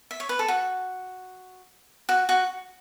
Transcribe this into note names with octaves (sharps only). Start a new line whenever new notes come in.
E5
C#5
B4
A4
F#4
F#4
F#4